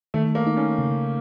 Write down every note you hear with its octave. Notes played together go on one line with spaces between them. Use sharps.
D#3 A3
A#3
D#4
C#4
C#3